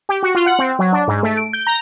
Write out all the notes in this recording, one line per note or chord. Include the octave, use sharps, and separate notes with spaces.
G4
F#4
F4
F#5
C4
F#3
D4
G#2
A3
D7
G6
A#5